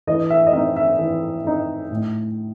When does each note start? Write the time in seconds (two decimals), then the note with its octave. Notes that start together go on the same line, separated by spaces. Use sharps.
0.07 E3 D#5
0.30 E5
0.47 D#5
0.53 C4 D#4 E5
0.76 E5
0.99 E3
1.45 C4 D#4
1.91 A2